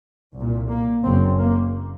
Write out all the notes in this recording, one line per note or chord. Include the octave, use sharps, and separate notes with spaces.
C2
A#2
A#3
F#1 F#2 C4
A#3